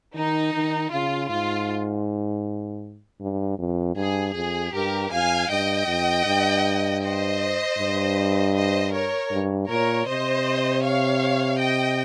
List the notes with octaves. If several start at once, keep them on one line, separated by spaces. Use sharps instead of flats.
D#3 D#4
D#3
C#3 F4
G#2 F4
G2
F2
G2 G#4
F2 G#4
G2 G4 A#4
F2 F5 G#5
G2 D#5 G5
F2
G2
C5 D#5
G2
C5 D#5
A#4 C#5
G2
A#2 A#4 C#5
C3 C5 D#5
C#5 F5
D#5 G5